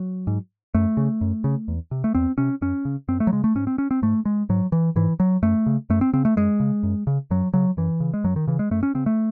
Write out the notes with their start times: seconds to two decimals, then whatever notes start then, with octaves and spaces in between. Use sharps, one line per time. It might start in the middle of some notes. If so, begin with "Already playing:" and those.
Already playing: F#3
0.27 G#2
0.74 F#2 A3
0.97 C#3
1.21 F#2
1.44 C#3
1.68 E2
1.91 C3
2.04 A3
2.15 E2 C4
2.38 C3 C#4
2.62 F#2 C#4
2.85 C#3
3.08 F#2 C4
3.20 A3
3.27 F#3
3.32 C#3 G#3
3.44 A3
3.55 G#2 C#4
3.67 C4
3.78 C#4
3.91 C4
4.02 G#2 A3
4.25 G#3
4.49 G#2 F#3
4.72 E3
4.96 G#2 E3
5.20 F#3
5.42 F#2 A3
5.66 C#3
5.90 F#2 A3
6.01 C4
6.13 C#3 C4
6.25 A3
6.36 F#2 G#3
6.60 C#3
6.83 F#2
7.07 C#3
7.31 F#2 F#3
7.54 C#3 F#3
7.77 F#2 E3
8.00 C#3
8.14 G#3
8.24 F#2 F#3
8.36 D#3
8.47 C#3 E3
8.59 G#3
8.71 F#2 A3
8.83 C#4
8.95 C#3 C4
9.06 A3